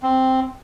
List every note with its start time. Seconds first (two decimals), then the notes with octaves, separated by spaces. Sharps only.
0.03 C4